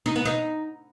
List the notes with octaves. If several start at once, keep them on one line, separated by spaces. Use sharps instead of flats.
D#4
B3
D#4